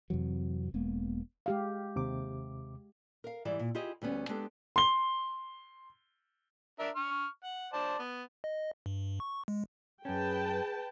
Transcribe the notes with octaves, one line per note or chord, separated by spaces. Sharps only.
F2 C3 E3 F#3
E1 G#3 A#3 B3
G#3 G4 F5
D#2 C3 D6
A#4 F5
G#2 E3 G3 E4 D5
A#2
E4 F4 G4 G#4 D#5
D2 G3 B3 C#4
G#3 B3 D4 G4 A4
C6 G7
D4 A#4 E5
C#6 F6
F#5
C5 D5 A5
B3
D#5
G2
C#6
G#3
F#2 C#4 G#4 B4 G5 A5